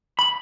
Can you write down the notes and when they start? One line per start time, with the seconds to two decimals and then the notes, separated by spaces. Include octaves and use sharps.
0.19 B5